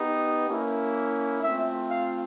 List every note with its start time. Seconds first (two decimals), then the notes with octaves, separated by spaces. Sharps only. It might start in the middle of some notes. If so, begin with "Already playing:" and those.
Already playing: B3 D#4 G4
0.48 A#3 C#4 E4
1.42 A3 C4 F4 E5
1.90 F5